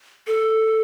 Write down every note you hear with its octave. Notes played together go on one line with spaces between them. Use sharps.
A4